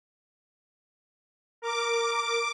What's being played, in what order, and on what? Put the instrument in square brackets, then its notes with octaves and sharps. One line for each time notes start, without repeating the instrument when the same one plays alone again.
[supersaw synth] A#4 [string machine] D6